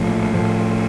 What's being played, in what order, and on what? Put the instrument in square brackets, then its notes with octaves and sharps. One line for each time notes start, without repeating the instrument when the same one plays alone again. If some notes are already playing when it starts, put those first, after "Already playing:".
Already playing: [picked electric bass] A#1 A2 F3
A2 F3